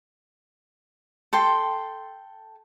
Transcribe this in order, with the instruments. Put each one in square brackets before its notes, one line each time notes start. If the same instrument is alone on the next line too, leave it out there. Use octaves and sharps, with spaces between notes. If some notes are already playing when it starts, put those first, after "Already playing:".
[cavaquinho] A4 G5 C6